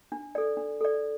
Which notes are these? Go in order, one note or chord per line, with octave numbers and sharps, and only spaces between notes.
D4
A4 D5
D4
A4 D5